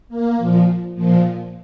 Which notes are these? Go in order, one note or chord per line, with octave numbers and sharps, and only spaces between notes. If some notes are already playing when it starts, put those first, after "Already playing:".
A#3
A#2 F3
A#2 F3